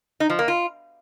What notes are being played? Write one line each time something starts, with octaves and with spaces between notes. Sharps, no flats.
D#4
F3
A#3
F4